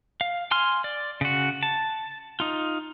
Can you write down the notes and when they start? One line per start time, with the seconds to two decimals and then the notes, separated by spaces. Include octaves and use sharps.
0.21 F5
0.51 G#5 C6 F6
0.84 D5
1.21 C#3 F#4
1.63 A5
2.40 D#4 F4